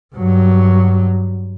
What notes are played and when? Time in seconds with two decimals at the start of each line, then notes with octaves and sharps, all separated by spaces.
0.15 G2 F#3